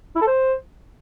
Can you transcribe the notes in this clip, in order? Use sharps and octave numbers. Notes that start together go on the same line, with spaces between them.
E4
A4
C5